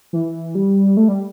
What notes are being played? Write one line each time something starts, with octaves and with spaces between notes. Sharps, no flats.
E3
G3
A3
G3